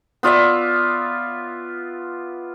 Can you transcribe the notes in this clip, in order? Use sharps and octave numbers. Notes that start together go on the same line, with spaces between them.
B3 F4 D5 E5